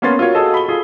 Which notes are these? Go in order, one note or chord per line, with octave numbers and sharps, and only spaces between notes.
A#3 B3 C#4 F5 C6 A6
F4 F#4 A#4 C#5
F#4 G#4 A4 D#5
B5 G7
F4 G#4 A4